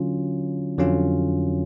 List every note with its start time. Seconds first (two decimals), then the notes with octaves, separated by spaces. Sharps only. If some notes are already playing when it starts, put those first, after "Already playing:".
Already playing: D3 F#3 C#4 F4
0.78 F2 D3 F#3 C#4 F4